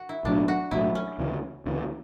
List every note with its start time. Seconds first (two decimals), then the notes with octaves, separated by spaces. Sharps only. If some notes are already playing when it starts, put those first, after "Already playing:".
Already playing: F#4
0.09 E4
0.24 B1 A2 F#3 D4
0.48 F#4
0.71 B1 A2 F#3 E4
0.95 C#4
1.18 D2 C#3 E3
1.66 D2 C#3 E3